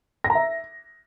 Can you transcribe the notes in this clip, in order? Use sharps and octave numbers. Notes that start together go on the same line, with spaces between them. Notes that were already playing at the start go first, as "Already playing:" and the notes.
A#6
A#5
E5